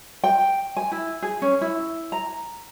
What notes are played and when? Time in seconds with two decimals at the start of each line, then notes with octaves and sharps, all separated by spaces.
0.24 G5
0.77 G#5
0.92 E4
1.23 G#4
1.42 C#4
1.61 E4
2.12 A#5